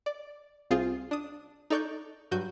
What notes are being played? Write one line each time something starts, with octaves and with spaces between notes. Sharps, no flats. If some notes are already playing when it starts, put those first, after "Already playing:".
D5
C2 C4 F4 G#4 D#6
D4 D#6
D#4 A4 D5 C#6 F#6 G6
G2 F#3 F#4 G6 D#7